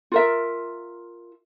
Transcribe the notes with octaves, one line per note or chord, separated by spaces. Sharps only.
F4 A#4 E5